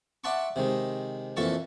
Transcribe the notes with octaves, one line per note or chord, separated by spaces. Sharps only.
D5 E5 F#5 A5 C6 C#6
C3 D#3 G#3
F2 A#2 E3 A4 A5 C#6